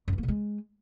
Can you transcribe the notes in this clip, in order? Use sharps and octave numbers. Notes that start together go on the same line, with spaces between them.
F#2
E3
A#3
B2
G#3